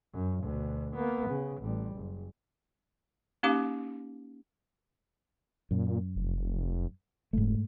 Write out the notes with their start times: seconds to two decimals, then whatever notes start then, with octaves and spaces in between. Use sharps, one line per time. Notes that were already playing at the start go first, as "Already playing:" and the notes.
0.14 F#2
0.43 D2 B2
0.95 A#3 B3
1.29 C#3
1.61 A1 G3
1.96 F#1
3.43 A#3 C#4 D#4 G4 F5 D6
5.71 F#2 A#2
6.16 F1
7.33 F1 G#2 A3